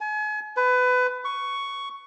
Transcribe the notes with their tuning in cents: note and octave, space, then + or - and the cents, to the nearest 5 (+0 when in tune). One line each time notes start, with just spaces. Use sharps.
G#5 +35
B4 +25
C#6 +5